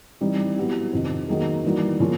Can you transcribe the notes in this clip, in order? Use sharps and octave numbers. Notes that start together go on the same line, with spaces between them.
E3 G3 C4 D#4 G4
F#3 B3 E4 G4
F2 C3 D#3
D#3 F#3 A#3 D#4 G#4
E3 G3 A#3 D#4 F#4
C#3 F3 A#3 C#4